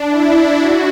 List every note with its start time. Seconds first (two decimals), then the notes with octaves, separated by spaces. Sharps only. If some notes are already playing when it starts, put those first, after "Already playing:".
Already playing: D4
0.08 E4
0.58 F#4